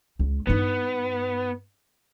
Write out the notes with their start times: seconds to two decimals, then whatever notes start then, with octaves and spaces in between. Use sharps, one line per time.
0.19 C#2
0.47 G2 B3 D#4